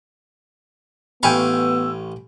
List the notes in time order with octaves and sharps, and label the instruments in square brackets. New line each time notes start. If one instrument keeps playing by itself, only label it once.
[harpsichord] A1 F5 C#6 [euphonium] B3 [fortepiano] G5 G#5 B5 [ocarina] E6